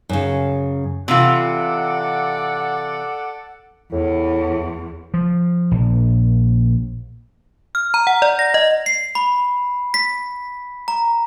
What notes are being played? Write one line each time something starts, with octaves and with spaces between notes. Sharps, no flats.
F#2 C#3
C3 E3 F4 A4 D5 F#5
E2 A2
F3
A#1
F6
A#5
F#5
D5
A#6
D#5
C7
B5
B6
A#5